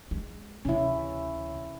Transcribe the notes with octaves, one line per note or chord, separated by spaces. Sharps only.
G#3
D2 C3 C#4 E4